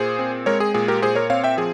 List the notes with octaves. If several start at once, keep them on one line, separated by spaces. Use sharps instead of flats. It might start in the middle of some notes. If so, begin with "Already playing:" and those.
Already playing: A#2 G#4 C5
C4
G#3 A#4 C#5
G#4
A#2 G#4
G4 A#4
A#2 G#4 C5
A#4 C#5
C4 C#5 F5
E5 G5
F3 G#4